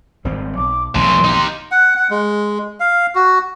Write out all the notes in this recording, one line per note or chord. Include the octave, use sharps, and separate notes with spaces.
G#1 G3 C4
B1 D6
B1 F2 A2 E3 C6
D#4 G4
F#5
F#5
G#3
F5
F#4